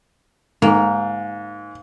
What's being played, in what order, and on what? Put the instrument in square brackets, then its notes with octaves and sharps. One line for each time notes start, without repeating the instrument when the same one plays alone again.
[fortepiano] G#2 [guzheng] A#3